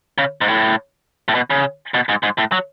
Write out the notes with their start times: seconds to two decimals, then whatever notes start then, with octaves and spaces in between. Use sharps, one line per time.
0.18 C#3
0.41 G#2
0.48 A2
1.28 A2
1.35 B2
1.50 C#3
1.94 B2
2.09 G#2
2.23 G#2
2.38 A2
2.52 F#3